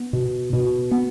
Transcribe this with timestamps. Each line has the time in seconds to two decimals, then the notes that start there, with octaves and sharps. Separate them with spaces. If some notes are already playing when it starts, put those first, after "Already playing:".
Already playing: B3
0.13 B2
0.53 B2
0.91 B3